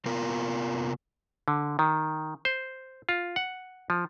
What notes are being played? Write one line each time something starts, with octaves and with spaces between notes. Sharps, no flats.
C3 B3 F4 A#4
D3
D#3
C5
F4
F#5
F3